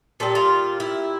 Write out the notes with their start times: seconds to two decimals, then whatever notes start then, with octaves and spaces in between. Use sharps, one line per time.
0.20 A#2 G3 A4
0.35 F4
0.80 E4